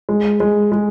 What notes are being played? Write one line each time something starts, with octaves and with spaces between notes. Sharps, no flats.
G#3
G#3
G#3